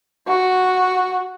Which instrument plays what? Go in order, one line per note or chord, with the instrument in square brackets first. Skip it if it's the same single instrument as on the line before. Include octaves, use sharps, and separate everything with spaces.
[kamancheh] F#4